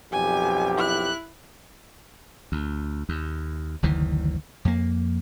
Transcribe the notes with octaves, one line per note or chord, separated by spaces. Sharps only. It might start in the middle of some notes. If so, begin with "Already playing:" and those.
B1 F2 G4 G#5
E4 F#6
D2
D#2
F#1 D2 D#3 E3
F2 A#3